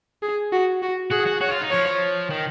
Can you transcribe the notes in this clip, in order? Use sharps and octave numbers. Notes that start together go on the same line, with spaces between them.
G#4
F#4
F#4
F#4 G#4
F#4
F#4 C#5
F4
D#4
F3 C#5
D#3